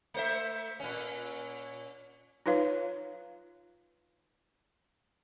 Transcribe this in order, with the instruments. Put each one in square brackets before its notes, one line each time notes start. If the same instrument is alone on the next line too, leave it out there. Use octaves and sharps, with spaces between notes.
[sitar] A3 C5 E5
A#2 C#4
[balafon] D#4 F4 B4 C#5 F5